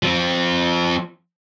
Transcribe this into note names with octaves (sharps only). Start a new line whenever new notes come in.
F3 C4